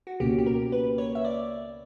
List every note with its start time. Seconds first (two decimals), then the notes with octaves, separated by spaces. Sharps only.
0.07 F#4
0.20 C#2 B2 A#3 C#4 G4
0.38 G4
0.46 A#4
0.72 B4
0.98 C#5
1.15 E5
1.24 D5